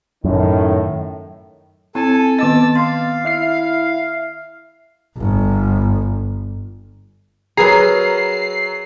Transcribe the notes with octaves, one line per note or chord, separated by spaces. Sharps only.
F#2 A2 D#3
C4 E4 A4 G#5 A5
D#3 B3 D#5 A5 D6 E6 A6
F5 C6
E4 E5 F6 C7
G1
F#3 G#4 A#4 B4 A#5 C7